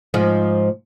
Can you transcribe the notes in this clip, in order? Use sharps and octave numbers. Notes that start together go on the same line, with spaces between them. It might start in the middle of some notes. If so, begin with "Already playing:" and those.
G#2 F3